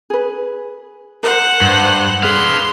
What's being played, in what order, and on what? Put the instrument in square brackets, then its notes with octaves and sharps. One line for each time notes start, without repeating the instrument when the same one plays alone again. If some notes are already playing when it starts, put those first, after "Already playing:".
[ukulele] G#4 B4
[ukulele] A#4 [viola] C5 F#5
[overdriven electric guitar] G2
[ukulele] G#4 D5 [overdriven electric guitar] B4 F5 [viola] C6